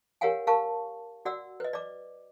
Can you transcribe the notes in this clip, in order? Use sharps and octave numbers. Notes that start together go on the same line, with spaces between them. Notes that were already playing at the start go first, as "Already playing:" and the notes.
G4 A#4 C#5 F5 F#5 G#5
A#4 F5 A5 C#6
F#4 D5 F#5 E6
B4 D#5
D5 D6